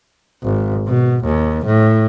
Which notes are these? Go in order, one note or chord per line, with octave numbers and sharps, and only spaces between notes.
G#1
B2
D#2
A2